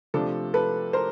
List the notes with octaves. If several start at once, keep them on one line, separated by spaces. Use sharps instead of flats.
C3 F3 A3 D4 A4
A4 B4
A#4 C5